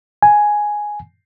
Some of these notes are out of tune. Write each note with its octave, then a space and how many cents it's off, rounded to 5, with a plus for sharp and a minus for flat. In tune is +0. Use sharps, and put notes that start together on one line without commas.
G#5 +5